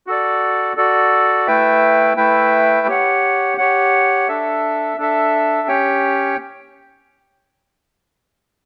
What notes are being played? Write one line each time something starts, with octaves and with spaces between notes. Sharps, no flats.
F#4 A4 D5
F#4 A4 D5
A3 E4 B4 E5 G5
A3 E4 B4 E5 G5
G4 C#5 F#5
G4 C#5 F#5
D4 A4 E5
D4 A4 E5
C#4 G4 C#5 G5